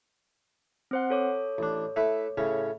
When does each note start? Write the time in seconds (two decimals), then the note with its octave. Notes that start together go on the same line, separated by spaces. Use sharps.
0.91 C4 C5 F#5
1.10 A4 C#5 D6
1.58 A1 D4
1.96 A3 E4 B4
2.37 A2 C#3 C#4